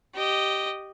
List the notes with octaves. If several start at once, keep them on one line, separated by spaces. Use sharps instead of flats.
G4 D#5